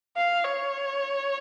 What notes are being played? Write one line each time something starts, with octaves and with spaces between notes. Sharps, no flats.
F5
C#5